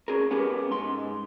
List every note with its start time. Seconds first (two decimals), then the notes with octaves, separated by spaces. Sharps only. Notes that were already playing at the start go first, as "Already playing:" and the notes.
0.08 C#4 G#4 A#4
0.31 B3 C#4 G4 A#4 B4
0.70 G#2 C6